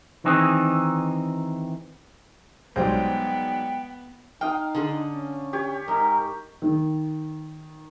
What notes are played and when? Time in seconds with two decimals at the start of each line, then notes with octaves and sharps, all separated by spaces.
0.24 D#3 E3 C4 D#4 G#4
2.76 B1 G#2 F#3 G3 B3 C5 G5 G6
4.41 D#4 F5 G5 D#6
4.75 D3 G#4
5.12 C#4
5.53 G4 C#5
5.88 G#2 D#4 A#4
6.62 D#3